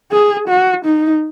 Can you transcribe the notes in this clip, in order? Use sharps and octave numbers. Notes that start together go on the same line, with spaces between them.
G#4
F#4
D#4